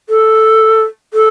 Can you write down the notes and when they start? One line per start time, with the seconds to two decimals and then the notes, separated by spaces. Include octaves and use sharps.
0.09 A4
1.14 A4